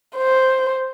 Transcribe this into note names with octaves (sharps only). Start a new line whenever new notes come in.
C5